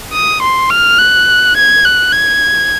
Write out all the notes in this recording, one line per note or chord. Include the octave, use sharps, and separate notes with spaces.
D#6
C6
F6
F#6
G#6
F#6
G#6